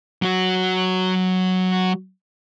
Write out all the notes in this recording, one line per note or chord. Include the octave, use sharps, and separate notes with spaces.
F#3 F#4